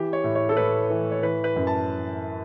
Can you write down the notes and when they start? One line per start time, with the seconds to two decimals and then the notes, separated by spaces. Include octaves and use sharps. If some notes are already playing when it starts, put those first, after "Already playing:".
Already playing: E3 G4
0.13 C#5
0.24 A2
0.35 C#5
0.49 A4
0.57 A2 B4
0.90 E3
1.12 C#5
1.23 E3 B4
1.44 B4
1.56 F#2
1.67 A5